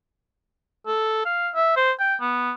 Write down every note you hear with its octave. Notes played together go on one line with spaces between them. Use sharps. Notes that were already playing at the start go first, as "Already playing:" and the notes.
A4
F5
E5
C5
G5
B3